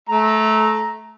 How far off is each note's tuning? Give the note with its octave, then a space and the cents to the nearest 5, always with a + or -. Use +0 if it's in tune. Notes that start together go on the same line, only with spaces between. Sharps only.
A3 -20 A#5 +0